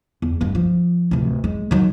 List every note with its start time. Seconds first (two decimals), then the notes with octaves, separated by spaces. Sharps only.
0.22 E2
0.41 G2 G#3
0.55 F3
1.11 D1 C3
1.44 G#3
1.71 D#3 F#3